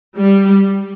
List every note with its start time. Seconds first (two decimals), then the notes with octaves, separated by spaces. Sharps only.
0.18 G3